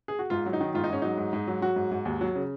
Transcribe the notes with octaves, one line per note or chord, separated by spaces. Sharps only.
G#4
F#4
G#2 F4
F#3
D#4
D#3
G#2 F4
D#4
G#2 C#4
F#3 D#4
G#2
G#2
F#3
F#3 F#4
G#2
G#2
D#2
F#3
C#3